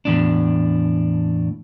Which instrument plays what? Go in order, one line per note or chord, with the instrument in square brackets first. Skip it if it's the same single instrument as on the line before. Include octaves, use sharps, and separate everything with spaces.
[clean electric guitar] E2 A2 D4